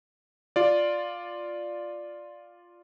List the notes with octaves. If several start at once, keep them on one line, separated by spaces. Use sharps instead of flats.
F4 D5